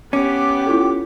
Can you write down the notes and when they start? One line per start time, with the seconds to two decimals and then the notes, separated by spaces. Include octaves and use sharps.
0.13 B3 C#4 G4 D6
0.66 E4 F4 A4